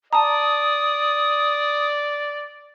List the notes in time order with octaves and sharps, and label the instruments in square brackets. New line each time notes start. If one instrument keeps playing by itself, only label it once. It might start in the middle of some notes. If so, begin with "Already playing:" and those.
[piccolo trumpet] D5 [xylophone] A5 A#5 [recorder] D#6